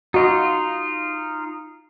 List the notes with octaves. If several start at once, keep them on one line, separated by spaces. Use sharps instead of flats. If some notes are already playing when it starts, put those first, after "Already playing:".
D#4 F4 F#4 D#5